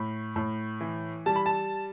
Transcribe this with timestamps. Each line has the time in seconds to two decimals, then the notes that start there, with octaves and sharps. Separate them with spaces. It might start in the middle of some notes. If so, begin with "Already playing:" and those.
Already playing: A2 B5
0.36 A2
0.81 E3
1.26 G3 A5
1.36 B5
1.46 A5